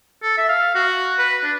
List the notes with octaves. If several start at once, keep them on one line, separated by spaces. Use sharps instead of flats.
A4
E5
F5
F#4
B4
D4